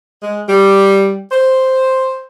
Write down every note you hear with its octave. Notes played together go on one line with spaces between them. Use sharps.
G#3
G3
C5